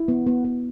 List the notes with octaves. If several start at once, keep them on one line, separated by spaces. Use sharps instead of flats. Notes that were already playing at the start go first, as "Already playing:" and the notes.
Already playing: E4
B3
B3
B3